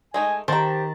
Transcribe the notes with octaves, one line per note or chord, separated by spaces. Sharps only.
G#3 A3 D#4 G#5
D#3 G4 C5 G5 A5 A#5